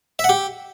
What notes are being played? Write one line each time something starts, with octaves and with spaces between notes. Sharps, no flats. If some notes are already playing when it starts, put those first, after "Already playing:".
E5
F#5
G4